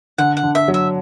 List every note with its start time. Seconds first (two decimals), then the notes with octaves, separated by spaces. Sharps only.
0.18 D3 F#5
0.37 F#5
0.43 D3
0.55 E5
0.68 F#3
0.74 E5